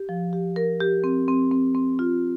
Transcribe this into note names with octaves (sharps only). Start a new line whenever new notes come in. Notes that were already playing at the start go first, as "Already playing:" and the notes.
Already playing: G4
F3
G4
A#4
G4
C4
C4
C4
C4
F4